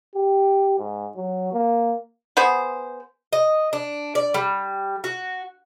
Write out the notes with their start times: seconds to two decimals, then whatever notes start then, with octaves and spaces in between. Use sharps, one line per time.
0.15 G4
0.79 G#2
1.16 F#3
1.53 A#3
2.37 B3 G#4 C5
3.33 D#5
3.73 D4
4.15 D5
4.34 G3
5.04 F#4